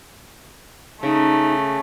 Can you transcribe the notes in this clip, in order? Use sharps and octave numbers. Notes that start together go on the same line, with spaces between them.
C#3 A3 D#4